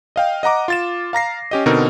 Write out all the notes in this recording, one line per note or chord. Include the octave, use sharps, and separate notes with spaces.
D#5 F5 G5
D#5 F#5 A#5 D6
F4 A6 E7
F5 A#5 A#6 C7
C#4 G4 D#5
B2 D3 C4 D#4 A#4